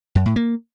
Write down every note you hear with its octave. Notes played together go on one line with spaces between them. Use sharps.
F#2
A2
A#3